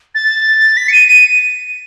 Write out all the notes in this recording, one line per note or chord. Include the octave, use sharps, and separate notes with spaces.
A6
B6
C#7
D#7
D#7